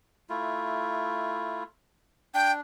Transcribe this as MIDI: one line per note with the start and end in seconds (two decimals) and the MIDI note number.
0.29 1.64 57
0.29 1.64 64
0.29 1.64 65
2.34 2.61 62
2.34 2.52 79